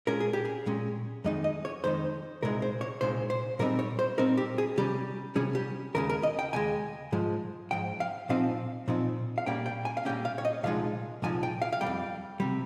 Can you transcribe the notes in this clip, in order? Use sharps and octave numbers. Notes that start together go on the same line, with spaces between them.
A#2 G#3 C#4 A#4
G#4
G4
G#4
A#2 G#3 C#4
F2 D#3 G#3 D#4 D#5
D#5
C#5
F2 D#3 G#3 D#4 C5
C2 A#2 G#3 D#4 A#4
C5
C#5
C2 A#2 G#3 D#4 C5
C5
A#2 G3 C4 D#4 A#4
C#5
C5
A#2 G3 C4 D#4 A#4
G4
G#4
C3 G3 C#4 G4
C3 G3 C#4 G#4
G4
D#2 C#3 G#3 A#4
A#4
D#5
G5
D#2 C#3 G#3 G#5
G#2 F3 G#3
G#2 F3 G5
F5
A#2 F3 C4 D#4 F5
A#2 F3 C4 D#4
F5
A#2 G3 A#3 C#4 G5
G5
G#5
F5
A#2 G3 A#3 C#4 G5
F5
C#5
D#5
C2 A#2 F3 G#3 D#4 F5
C2 A#2 F3 G#3 D#4 G#5
G5
F5
F5
C3 G3 G5
F2
C3 G3